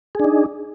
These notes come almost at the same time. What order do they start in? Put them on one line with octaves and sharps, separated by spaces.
G#4 D4 D#4